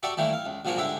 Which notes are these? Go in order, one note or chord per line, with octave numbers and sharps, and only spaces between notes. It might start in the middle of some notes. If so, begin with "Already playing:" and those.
F#4 G4 A4 D5 E5
D#3 E3 G3 A3 A#3 E4
F5
C#2
A#1 F3 G3 F#4 G#4 A#4
C#2 G#2 D3 E4 G4 E5